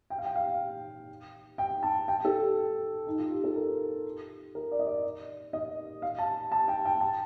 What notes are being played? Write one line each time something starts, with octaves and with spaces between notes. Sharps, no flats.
G5
F5
G5
F5
G5
A5
G5
A4
G4
D#4
F4
G4
A4
A#4
A#4
D5
D#5
D5
D#5
F5
A5
A5
G5
G5
A5